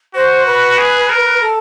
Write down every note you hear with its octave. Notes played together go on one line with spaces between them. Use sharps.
F#4 C5
B4
G#4
A#4
A4